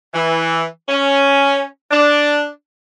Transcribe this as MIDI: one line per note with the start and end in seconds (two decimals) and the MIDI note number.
0.14 0.65 52
0.89 1.65 61
1.91 2.48 62